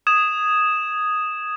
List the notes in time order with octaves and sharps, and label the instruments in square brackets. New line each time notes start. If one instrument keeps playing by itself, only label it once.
[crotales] D#6 G#6 E7